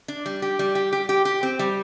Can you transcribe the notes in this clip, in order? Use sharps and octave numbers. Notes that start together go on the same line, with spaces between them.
D4
G3
G4
G3
G4
G4
G4
G4
C4
G3